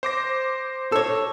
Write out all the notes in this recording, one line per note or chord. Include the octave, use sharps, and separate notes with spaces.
C5 D6 A#6
A4 C#5 E6